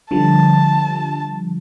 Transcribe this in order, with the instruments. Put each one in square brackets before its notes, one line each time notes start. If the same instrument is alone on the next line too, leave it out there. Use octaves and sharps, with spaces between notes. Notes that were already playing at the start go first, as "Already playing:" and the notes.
[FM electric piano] D3 F3 G3 [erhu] A5